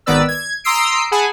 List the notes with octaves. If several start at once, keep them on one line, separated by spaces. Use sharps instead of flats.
G#1 D#3 B3 B4 D5 E6
G#6
A#5 C6 D#6 E6 C7 D7
G#4 F#5 G#5 A5 B5